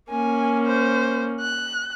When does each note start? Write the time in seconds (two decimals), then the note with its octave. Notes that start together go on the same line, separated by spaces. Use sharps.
0.10 A#3 C#4 G#5
0.66 C5
1.40 F#6